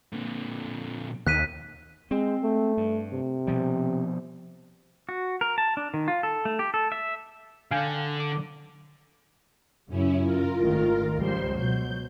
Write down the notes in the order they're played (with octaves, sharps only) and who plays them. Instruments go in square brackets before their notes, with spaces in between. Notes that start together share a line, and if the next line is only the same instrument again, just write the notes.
[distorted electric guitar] A#2 D3
[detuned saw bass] D#2 [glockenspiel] F#6 B6 D#7
[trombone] G#3 [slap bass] C4
[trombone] A3
[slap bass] G2
[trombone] C3
[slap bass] B2 F3 G3
[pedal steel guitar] F#4
A#4
A5
D4
D#3
F4
A4
A3
G4
A4
E5
[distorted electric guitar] D3 [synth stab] F5 G5 G#5
[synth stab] D6
[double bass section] F#2 C#3 [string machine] C#4 E4
[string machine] F4 A#4
[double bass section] G#1 D#3 A3
[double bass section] C#2 F3 G3 [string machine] C5 C6
[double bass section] B2 F#3 [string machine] G6